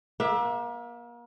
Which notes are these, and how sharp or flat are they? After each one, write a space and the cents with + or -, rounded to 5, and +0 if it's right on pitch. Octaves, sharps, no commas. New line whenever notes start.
A#3 +35 E5 +0